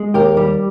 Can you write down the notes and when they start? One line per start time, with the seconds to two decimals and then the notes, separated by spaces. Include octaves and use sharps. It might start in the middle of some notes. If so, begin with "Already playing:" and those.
Already playing: G#3
0.14 D#2 G4 A#4
0.37 G3